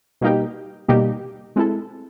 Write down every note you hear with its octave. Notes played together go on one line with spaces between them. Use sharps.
B2 G3 A#3 D#4 G4
B2 G3 A#3 D#4 G4
G#3 C4 E4 A4